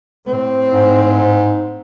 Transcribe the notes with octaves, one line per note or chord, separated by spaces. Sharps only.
A2 C4
G#2